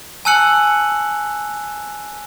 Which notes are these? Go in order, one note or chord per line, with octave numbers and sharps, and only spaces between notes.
G#5 A5 E6 F#6 C#7 F#7